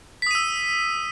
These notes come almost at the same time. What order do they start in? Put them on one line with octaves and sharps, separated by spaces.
B6 D#6 D#7 E6